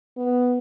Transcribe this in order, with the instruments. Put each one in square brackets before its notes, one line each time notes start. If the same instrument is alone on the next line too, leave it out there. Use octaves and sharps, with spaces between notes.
[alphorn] B3